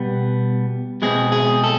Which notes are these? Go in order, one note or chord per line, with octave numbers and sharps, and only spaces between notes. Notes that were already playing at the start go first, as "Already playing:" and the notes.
Already playing: B2 G3 B3
B2 G#3 C4 G#4
G#4
A4